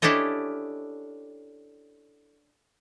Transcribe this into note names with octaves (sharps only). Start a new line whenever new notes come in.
C#4 D4 E4 G4 A4 D#5